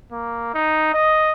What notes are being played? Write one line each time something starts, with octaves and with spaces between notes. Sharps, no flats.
A#3
D#4
D#5